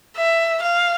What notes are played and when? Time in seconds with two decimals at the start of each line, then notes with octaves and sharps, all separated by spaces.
0.17 E5
0.63 F5